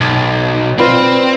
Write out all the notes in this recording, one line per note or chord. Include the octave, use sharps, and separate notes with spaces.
B1 A6
C4 F4 B4 D5